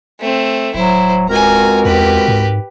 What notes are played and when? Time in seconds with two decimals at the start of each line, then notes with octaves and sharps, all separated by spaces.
0.20 A3 C4
0.74 D1 F#3 E4 C5
1.29 C#2 C4 F#4 A#4 G#5 A#5
1.85 E2 G4 B4
2.28 G#2